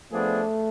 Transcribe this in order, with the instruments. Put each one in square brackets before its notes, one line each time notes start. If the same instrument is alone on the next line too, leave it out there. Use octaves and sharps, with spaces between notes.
[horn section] F3 B3 D4 G#4 [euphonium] A3